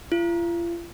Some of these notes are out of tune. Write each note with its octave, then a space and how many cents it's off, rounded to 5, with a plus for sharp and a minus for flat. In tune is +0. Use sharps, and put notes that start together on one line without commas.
F4 -40